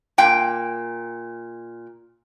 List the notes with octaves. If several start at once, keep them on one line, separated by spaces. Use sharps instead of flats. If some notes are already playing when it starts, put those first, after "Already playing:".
A#2 G5